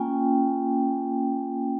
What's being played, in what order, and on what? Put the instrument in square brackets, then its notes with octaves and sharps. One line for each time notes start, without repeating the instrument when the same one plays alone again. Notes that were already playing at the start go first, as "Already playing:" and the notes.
Already playing: [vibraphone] A#3 C#4 F4 G5 G#5